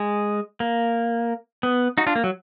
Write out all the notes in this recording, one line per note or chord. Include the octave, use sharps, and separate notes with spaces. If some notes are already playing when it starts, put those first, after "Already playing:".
Already playing: G#3
A#3
B3
D#4 F#4
D4 F4
A#3
F#3